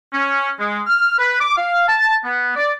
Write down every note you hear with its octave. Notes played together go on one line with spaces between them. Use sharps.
C#4
G#3
F6
B4
D6
F5
A5
B3
D5